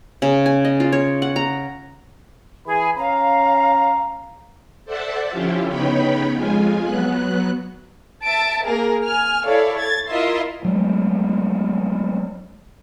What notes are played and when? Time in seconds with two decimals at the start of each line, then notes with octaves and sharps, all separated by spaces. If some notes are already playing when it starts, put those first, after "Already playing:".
0.22 C#3
0.46 G#5
0.65 D#5
0.80 F4
0.92 C#5
1.22 F#5
1.36 A#5
2.66 E3 G#4 B5
2.98 C#4 F5 A#5
4.85 A4 C5 D5 E5 F#5 A5
5.30 D3 F3 C#4 E4 F4 G4
5.67 C#3 B3 D#4 C#5 G5 B5
6.33 F2 G#3 F4 G#5
6.83 F#3 B3 F#6
8.24 E5 A5 D7
8.63 A#3 G#4 A#4
9.05 G#5 F6
9.45 E4 A4 C#5 D5 F5
9.79 G#6 A6
10.10 E4 F4 A#4 D#5 E5 C6
10.65 F#3 G#3 A3